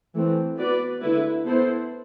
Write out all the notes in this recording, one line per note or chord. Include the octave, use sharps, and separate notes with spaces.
E3 A3 C4
B3 F#4 B4 D5
D3 A3 E4 B4
B3 E4 A4 C5